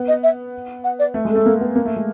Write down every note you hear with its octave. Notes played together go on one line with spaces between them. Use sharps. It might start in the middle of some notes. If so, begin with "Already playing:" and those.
Already playing: B3
D#5
E5
F#5
D5
A3
G#3
A4
A3
A#3
B3
A#3
A3
G#3